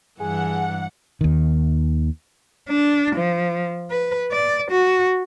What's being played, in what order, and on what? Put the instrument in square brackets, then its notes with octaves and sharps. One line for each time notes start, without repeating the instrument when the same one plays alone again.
[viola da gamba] G2 E3 [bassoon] G#4 [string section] F#5
[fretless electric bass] D#2 D#3
[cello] D4
F3
B4
D5
F#4